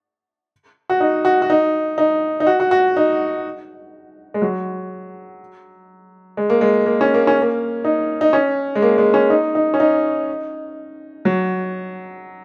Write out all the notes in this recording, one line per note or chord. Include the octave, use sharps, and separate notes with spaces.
F#4
D#4
F#4
F#4
D#4
D#4
D#4
F#4
F#4
F#4
D#4
G#3
F#3
G#3
A#3
G#3
A#3
C#4
A#3
C#4
A#3
D#4
D#4
C#4
G#3
A#3
G#3
C#4
D#4
D#4
C#4
D#4
F#3